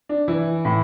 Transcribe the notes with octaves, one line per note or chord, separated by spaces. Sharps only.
D4
E3 E4
A2